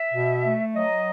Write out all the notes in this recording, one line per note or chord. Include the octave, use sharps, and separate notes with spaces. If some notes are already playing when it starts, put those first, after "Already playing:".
Already playing: E5
B2
A3
F#3 D#5